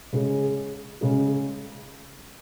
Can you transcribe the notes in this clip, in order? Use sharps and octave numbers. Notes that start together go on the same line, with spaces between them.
C#3 G#3 C#4 G#4
C#3 G#3 C#4 G#4